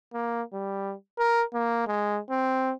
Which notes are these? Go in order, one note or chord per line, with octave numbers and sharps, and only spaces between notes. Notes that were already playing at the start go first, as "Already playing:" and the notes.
A#3
G3
A#4
A#3
G#3
C4